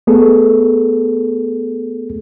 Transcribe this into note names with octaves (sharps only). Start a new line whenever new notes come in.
A3 B3 G#4 A4